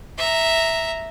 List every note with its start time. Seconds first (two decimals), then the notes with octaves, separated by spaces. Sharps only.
0.18 E5 A#5